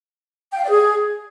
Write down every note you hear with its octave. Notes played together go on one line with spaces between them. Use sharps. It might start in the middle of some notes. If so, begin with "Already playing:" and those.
G5
F5
D5
G#4